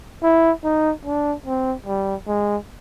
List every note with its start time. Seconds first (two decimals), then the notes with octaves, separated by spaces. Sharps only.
0.23 E4
0.64 D#4
1.05 D4
1.46 C4
1.87 G3
2.28 G#3